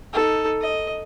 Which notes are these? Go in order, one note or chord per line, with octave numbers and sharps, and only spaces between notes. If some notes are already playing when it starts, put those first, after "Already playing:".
D#4 A4
D#5